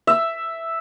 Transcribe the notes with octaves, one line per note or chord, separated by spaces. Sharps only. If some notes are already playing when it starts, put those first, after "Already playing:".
E5